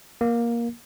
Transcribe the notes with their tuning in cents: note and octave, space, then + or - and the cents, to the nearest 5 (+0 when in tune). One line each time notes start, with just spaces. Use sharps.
A#3 +15